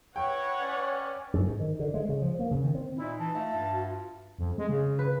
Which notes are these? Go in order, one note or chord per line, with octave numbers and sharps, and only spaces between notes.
E4 B4 C#5 F#5 G5 C#6
C#4 D5
F#2
G#2
D#3
D3
G#3
C#3
F3
A#3
C#3
D#3
C4
A#2 D#4 E4
E3 A5
A3 F4 E5 F5
G2
F#4
F4
F2
G#3
C#3
B4